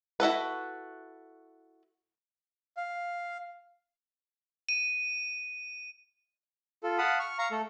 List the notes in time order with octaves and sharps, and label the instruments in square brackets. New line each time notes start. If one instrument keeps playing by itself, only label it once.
[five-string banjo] E4 F#4 A4 B4
[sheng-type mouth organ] F5
[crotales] D#7
[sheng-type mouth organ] F4 A4
F5 F#5 A5 B5 D#6
C#6 F6
F5 A#5 C#6
A3 A4